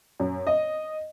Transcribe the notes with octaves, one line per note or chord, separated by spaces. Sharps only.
F#2
D#5